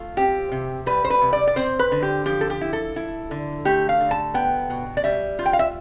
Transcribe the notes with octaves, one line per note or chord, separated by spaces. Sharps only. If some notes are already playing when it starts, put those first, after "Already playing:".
Already playing: A3 F4
C4 G4
C3
G3 B4
C5
B4
C3
D5
D5
C4 C5
B4
D3
G4
F3 G4
A4
G4
E4
A4
E4
D3
A3 G4
F5
D3
A5
B3 G5
B2
D5
G3 E5
F4
G5
F5
E5